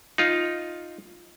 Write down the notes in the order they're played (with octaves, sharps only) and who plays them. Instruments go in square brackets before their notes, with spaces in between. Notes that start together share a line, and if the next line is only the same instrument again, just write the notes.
[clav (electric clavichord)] D#4 F4